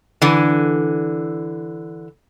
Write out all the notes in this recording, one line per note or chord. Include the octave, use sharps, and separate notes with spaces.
D3 E3